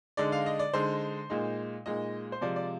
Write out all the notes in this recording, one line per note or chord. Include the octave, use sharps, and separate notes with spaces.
D3 G#3 D#4 D5
F5
D#5
D5
D3 G#3 D#4 C5
A#2 G#3 D#4
A#2 G#3 D#4 D#5
C5
C3 F3 G#3 D5
D5